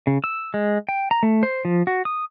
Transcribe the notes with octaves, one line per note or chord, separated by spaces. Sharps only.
C#3
E6
G#3
G5
A#5
A3
C5
F3
F#4
D#6